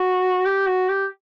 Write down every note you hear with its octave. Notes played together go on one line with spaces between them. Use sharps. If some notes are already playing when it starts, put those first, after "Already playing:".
Already playing: F#4
G4
F#4
G4